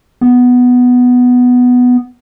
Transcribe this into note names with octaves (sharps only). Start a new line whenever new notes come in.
B3